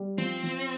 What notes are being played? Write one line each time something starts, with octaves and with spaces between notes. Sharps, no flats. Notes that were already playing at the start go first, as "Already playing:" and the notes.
Already playing: G3
F3 C4
F3